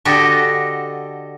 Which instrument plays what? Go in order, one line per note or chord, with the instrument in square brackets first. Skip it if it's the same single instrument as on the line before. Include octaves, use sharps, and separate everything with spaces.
[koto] D3 F#4 G4 A4 D#5